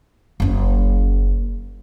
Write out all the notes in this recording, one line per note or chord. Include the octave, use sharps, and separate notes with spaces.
F#1 C#4